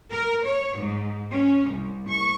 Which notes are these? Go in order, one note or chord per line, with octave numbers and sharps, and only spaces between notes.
A#4
C#5
G#2
C#4
C2
C#6